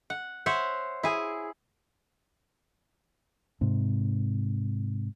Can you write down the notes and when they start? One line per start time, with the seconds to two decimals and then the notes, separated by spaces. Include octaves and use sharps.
0.10 F#5
0.46 C5 C#5 E5 F#5
1.03 E4 G#4
3.61 G#2 C3